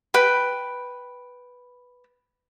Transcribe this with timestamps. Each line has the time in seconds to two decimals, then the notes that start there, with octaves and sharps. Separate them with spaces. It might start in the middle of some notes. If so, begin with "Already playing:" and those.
0.14 B4 G5 B5